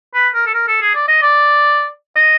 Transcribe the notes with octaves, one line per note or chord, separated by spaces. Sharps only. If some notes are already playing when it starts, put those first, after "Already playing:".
B4
A#4
A4
A#4
A4
G#4
D5
D#5
D5
D#5